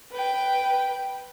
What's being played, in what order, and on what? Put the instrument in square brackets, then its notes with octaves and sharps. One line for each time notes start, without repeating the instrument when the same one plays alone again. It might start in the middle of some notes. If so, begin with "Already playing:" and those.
[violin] B4 G5